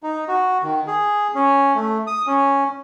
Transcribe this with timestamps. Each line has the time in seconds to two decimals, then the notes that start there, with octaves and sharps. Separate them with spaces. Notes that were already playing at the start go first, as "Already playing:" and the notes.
0.03 D#4
0.28 F#4
0.63 D#3
0.87 G#4
1.35 C#4
1.75 A3
2.07 D#6
2.27 C#4